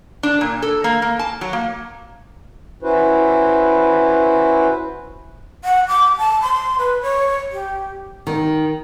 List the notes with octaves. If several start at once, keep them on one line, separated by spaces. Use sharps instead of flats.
D4
A#2
A4
A#3
A#3
A5
F#3
A#3
C#4 E4 F#4 B4 C5
F#5
D6
A5
C6
B4
C#5
G4
D#3